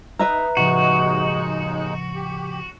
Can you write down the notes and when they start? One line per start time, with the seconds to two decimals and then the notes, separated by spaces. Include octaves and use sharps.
0.19 D#4 B4 E5 A#5
0.57 D#2 A2 C#3 F3 G#3 D#4 F#4
2.15 G4